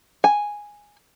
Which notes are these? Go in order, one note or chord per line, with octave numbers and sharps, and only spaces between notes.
G#5